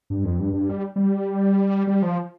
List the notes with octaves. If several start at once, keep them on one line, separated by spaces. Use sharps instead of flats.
G2
F2
G2
G2
G3
G3
G3
F3